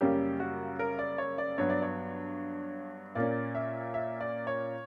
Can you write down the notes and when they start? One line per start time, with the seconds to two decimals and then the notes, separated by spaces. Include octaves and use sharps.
0.01 F#2 C#3 G3 A#3 C#4 G4
0.40 F#4
0.79 A#4
0.99 D5
1.18 C#5
1.38 D5
1.58 G2 F#3 B3 C#5
1.70 D5
1.82 C#5
3.15 A#2 A#3 C#4 D5
3.55 E5
3.94 E5
4.21 D5
4.47 C#5